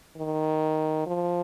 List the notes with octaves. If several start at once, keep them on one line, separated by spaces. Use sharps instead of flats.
D#3
F3